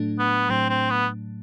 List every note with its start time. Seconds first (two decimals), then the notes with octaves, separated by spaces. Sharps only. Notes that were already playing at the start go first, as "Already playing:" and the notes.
Already playing: A2 F#3 A3 D4
0.19 B3
0.50 A2 F#3 A3 C4 D4
0.69 C4
0.90 B3